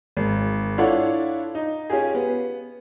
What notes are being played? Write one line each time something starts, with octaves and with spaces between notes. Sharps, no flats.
G#1
D4 E4 F4 A4 C#5 F#5
D#4
C#4 F4 G4 G#4
B3